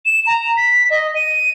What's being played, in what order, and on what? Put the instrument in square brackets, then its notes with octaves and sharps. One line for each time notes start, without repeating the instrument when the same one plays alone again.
[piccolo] E7
A#5
B6
D#5
D#7